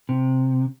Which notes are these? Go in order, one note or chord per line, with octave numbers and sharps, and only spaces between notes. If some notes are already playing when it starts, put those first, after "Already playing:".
C3